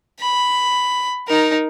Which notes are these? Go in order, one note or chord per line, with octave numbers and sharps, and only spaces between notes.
B5
D#4 A#4